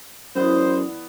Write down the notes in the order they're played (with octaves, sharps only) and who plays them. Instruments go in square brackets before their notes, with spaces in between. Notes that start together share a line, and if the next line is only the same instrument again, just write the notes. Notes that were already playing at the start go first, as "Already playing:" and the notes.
[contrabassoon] F#2 [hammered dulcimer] E3 B3 D5 [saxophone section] C5